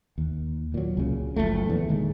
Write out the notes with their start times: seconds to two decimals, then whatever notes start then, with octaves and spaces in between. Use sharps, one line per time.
0.18 D#2
0.74 A#2 F#3
0.97 C#2 C#3
1.36 F#1 D#2 F3 A3
1.66 A#1 E2
1.88 G1 D#3 G#3 A#3